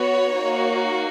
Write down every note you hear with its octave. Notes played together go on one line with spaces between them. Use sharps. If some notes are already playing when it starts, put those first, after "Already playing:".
Already playing: B3 F#4 C#5
A#3 D#4 F#4